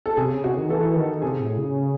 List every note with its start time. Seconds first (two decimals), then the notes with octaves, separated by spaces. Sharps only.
0.06 A4
0.17 C3 G#4
0.30 C#3
0.43 C3 F#4
0.51 C#3
0.57 D#3
0.69 E3 A4
0.96 D#3
1.22 C3 G#4
1.40 A2
1.58 C#3